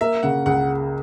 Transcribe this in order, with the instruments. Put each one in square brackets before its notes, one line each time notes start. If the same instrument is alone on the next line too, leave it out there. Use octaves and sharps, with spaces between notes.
[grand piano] A#3 [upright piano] E5
[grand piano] C#3 [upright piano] F#5
[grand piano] C#2 [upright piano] F#5